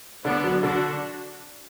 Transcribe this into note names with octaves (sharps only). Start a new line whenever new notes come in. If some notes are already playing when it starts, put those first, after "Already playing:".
D3 B3 D4
F#3
D3 D4 F#4